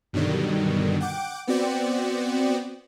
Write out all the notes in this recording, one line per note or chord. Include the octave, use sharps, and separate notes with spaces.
G2 B2 D3 D#3 F#3 G3
F#5 G5 D6 D7
B3 C4 F#4 D5 G5